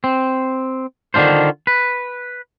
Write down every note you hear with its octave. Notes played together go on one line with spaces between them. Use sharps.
C4
D3 D#3 D4 F4 C5
B4